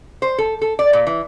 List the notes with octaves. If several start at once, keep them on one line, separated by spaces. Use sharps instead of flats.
C5
A4
A4
D5
A#2
E3